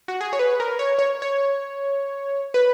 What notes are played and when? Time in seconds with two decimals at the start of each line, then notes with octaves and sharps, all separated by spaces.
0.08 F#4
0.21 G#4
0.33 C#5
0.39 B4
0.60 A#4
0.79 C#5
0.99 C#5
1.22 C#5
2.54 B4